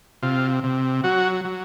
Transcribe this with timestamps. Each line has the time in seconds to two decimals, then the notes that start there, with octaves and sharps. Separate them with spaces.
0.22 C3 F4
0.64 C3
1.04 F#3 F#4
1.45 F#3